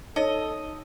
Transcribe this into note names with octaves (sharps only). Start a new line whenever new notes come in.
D#4 A4 C#5 D#5